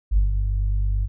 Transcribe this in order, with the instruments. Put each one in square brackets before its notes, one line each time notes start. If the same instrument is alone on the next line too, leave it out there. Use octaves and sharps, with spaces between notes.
[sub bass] G1